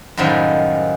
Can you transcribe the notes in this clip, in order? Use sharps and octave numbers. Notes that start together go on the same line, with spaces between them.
F#2 A2 D#3 F3 G3 G#3